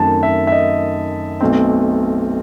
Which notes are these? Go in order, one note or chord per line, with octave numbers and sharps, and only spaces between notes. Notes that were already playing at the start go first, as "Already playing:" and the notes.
Already playing: F#2 D#3 A3 C4 A5
E5
E5
D#5
B1 B2 A3 C4